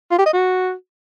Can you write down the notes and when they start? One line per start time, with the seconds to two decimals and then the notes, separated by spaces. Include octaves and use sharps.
0.11 F4
0.19 G4
0.26 D#5
0.33 F#4